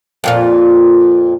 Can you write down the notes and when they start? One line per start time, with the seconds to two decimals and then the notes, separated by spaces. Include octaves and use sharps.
0.24 F2 A#2 F4